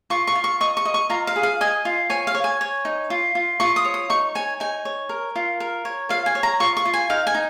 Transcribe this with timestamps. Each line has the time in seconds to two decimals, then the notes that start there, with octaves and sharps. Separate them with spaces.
0.10 F4 C#6
0.27 C#6
0.35 F4
0.44 C#6
0.61 D#5 C#6
0.77 C#6
0.85 D#5
0.94 C#6
1.10 F4 A#5
1.27 F5
1.36 G#4
1.43 F5
1.61 D#5 G#5
1.85 F4
2.10 C#5 G#5
2.27 F5
2.35 C#5
2.44 G#5
2.61 C#5
2.85 D#4
3.10 F4
3.35 F4
3.60 F4 C#6
3.76 D#6
3.85 C#5
3.94 D#6
4.10 D#4 C#6
4.35 C#5 G#5
4.60 D#4 G#5
4.85 C#5
5.09 A#4
5.36 F4
5.60 A#4
5.85 C#5
6.09 F4 F5
6.26 G#5
6.35 C#5
6.43 A#5
6.60 F4 C#6
6.77 C#6
6.85 F4
6.94 G#5
7.10 D#4 F5
7.27 G#5
7.35 D#4